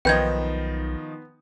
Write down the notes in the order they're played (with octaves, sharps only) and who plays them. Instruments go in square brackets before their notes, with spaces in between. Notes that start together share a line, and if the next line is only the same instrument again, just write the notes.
[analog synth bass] B1 [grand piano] D#3 F3 D#4 [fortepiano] B3 [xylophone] G5 G6 G#6